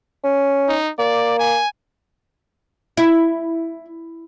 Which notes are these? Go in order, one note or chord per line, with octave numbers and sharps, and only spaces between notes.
C#4
D#4
A#3 D5
G#5
E4